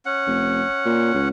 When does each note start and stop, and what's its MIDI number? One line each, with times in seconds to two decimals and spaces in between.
0.06 1.29 61
0.06 1.29 78
0.27 0.63 29
0.85 1.13 46
1.14 1.29 37